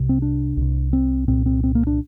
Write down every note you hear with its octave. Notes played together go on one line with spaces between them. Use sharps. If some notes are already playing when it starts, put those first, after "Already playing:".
Already playing: C2 C3
C4
D4
C2 C3
C4
C2 A#2 C4
C4
C4
A#3
D4